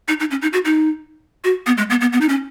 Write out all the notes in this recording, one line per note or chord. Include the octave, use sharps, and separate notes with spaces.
D#4
D#4
C#4
D#4
F#4
D#4
F#4
B3
G#3
B3
B3
B3
D#4
C#4